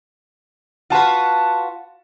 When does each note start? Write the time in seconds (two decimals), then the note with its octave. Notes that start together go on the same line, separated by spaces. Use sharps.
0.90 F4 F#4 B4 F#5 A5